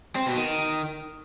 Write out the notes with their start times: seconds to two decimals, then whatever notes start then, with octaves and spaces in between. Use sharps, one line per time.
0.15 C4
0.26 B2
0.37 D#3